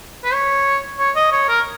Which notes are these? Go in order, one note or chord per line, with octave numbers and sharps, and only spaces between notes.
B4
C#5
C#5
D#5
C#5
A#4